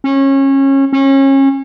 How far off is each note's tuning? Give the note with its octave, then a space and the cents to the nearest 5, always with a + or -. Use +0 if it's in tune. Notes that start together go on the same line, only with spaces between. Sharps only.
C#4 -25
C#4 -30